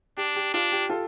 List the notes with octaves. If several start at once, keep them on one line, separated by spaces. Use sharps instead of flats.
D4 G4
G4
D4 F4
G4
F4 A4